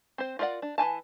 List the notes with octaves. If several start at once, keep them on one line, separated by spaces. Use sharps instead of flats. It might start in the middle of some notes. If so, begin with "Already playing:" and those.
C4 C5
F4 A#4 D5 E5 F#5
D4
E3 F4 G#5 A5